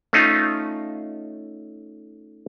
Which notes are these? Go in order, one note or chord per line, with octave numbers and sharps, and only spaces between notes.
A3 C#4 D#4 F4